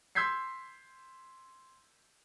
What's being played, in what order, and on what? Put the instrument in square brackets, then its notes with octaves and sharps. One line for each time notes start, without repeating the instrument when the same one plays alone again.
[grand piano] C6 E6 G6 G#6 B6 C7